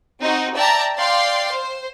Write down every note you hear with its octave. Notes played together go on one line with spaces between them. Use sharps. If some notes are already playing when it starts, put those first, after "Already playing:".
C4 D#4 F#4
D5 E5 G5 A5 A#5
D5 F5 G5 C6
C5